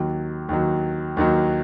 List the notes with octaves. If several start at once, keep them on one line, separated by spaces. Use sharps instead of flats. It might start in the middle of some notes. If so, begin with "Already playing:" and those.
Already playing: D#2 D#3 F#3
D#2 D#3 F#3
D#2 D#3 F#3